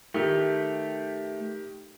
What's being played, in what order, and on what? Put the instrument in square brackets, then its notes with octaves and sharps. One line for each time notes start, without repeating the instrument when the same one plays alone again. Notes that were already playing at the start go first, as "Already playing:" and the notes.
[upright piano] D#3 G4 [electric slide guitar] A3